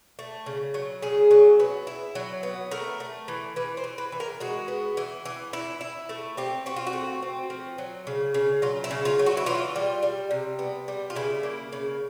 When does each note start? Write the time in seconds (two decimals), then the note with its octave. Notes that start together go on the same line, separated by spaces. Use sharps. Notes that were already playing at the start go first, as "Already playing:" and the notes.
0.19 A3
0.46 C#3
0.74 F#3
1.02 C#3 G#4
1.31 F#3
1.60 B3
1.87 E4
2.15 F#3
2.43 B3
2.71 A3 A#4
3.00 A3
3.28 E3
3.56 E3 B4
3.77 C5
3.84 E3
3.98 B4
4.12 E3
4.20 A#4
4.40 G#3 F#4
4.68 B3
4.97 E3
5.25 E3
5.53 E4
5.81 E4
6.09 A3
6.37 C4 G4
6.66 C4 F#4
6.76 F4
6.87 F#4
6.93 A3
7.22 C4
7.50 F3
7.78 F#3
8.07 C#3
8.34 C#3
8.62 F#3 F4
8.84 E4
8.91 C#3
9.05 F4
9.19 F#3
9.26 F#4
9.37 E4
9.46 E3 F4
9.76 G3
10.03 G3
10.31 C3
10.59 B3
10.88 G3
11.10 F4
11.16 C#3 E4
11.43 A#3
11.73 C#3